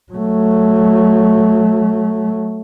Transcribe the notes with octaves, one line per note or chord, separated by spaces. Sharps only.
F#3 A3